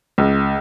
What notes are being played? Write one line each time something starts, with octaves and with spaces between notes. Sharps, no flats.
C#2